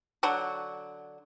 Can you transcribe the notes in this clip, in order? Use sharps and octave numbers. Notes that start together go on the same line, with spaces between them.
D3 F#3 F#5